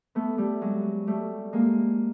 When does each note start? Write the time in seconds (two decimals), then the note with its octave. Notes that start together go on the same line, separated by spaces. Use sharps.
0.15 A3 B3
0.38 G3 A3
0.61 F#3 G#3
1.07 G3 A3
1.53 G#3 A#3